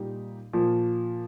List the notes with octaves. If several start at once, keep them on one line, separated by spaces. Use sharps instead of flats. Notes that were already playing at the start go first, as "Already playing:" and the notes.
Already playing: A#2 G3 D#4 G4
A#2 F3